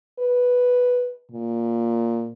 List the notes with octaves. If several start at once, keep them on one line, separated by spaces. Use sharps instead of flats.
B4
A#2